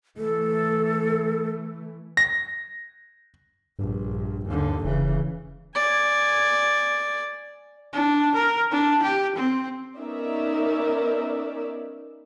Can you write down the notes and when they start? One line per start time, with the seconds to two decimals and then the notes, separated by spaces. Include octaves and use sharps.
0.17 E3 A3 A4
2.17 A#6
3.79 A#1 G2
4.15 G2
4.48 D#2 D3
4.84 E1 C#3 E3
5.75 D5 G#5
7.93 D4
8.35 A#4
8.71 D4
9.02 G4
9.36 C4
9.97 B3 C#4 D#4 A#4 D5 E5